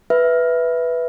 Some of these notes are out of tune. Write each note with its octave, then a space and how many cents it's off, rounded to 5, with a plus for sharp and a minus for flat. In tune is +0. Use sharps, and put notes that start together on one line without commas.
B4 +0 E5 +0